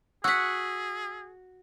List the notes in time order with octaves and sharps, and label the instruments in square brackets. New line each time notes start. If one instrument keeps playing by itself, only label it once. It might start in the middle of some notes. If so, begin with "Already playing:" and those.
[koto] F#4 F#5 [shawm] G#4 [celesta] E6 B6